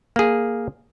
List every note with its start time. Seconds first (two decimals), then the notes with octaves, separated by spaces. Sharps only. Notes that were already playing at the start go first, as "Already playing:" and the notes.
0.16 A#3 G#4